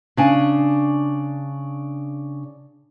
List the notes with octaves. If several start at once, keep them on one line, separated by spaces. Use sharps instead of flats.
C#3 D4 G#5